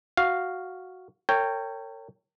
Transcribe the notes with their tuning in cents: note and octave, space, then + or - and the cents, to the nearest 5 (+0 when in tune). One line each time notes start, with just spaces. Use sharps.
F#4 +0 F5 +0
A#4 -45 C#5 +0 G5 +0